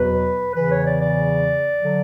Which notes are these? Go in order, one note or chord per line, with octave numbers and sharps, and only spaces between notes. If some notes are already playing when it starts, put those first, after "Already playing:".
Already playing: E2 B2 F#3 B4
E2 C#3 E3 B4
C#5
D5
D5
D3 F#3